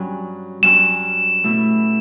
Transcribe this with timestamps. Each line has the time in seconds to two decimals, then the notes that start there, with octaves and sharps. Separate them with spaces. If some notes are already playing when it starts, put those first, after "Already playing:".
Already playing: G2 F#3 C#4
0.63 G2 F#3 C#4 E7
1.44 B2 A3 E4